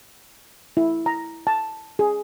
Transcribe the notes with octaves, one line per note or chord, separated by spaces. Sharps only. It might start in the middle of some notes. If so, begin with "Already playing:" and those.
E4
A#5
A5
G#4